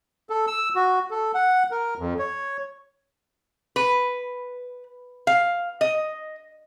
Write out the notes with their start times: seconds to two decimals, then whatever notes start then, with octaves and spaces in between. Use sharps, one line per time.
0.30 A4
0.47 E6
0.75 F#4
1.11 A4
1.34 F#5
1.71 A#4
1.98 F2
2.19 C#5
3.76 B4
5.27 F5
5.81 D#5